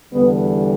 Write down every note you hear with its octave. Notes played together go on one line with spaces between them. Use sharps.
E2 D3 G3 B3